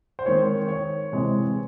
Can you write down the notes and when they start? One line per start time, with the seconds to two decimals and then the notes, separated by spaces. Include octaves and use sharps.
0.19 C5
0.26 D#3 G#3 C4 C#5
0.68 C#5
1.12 C3 E3 G#3 C4